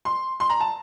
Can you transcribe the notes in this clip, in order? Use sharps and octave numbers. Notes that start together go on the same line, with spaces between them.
C6
C6
A#5
A5